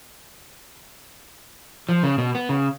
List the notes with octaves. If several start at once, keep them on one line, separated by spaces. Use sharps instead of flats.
F3
C#3
B2
B3
C#3